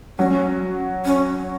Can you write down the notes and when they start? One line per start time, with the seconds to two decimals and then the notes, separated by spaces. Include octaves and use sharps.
0.18 F#3 C#4
1.05 C#4